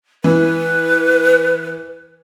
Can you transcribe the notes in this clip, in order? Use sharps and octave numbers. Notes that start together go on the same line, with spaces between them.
E3 B4